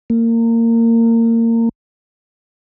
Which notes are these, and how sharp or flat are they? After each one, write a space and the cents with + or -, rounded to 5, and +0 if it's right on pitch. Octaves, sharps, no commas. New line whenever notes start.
A#3 -25